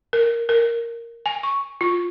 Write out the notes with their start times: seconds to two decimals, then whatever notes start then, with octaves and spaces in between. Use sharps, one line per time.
0.13 A#4
0.49 A#4
1.26 G#5
1.43 C#6
1.81 F4